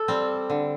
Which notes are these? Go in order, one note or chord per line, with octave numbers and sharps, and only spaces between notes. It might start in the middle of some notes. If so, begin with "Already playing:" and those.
Already playing: A4
G3 C4
D3